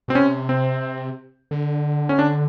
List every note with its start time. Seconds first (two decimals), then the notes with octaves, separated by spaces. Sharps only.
0.08 B2 C4
0.14 C3 C#4
0.49 C4
1.51 D3
2.09 C#4
2.19 D4